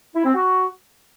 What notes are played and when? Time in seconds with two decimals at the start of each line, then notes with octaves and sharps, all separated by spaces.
0.15 E4
0.25 C4
0.34 F#4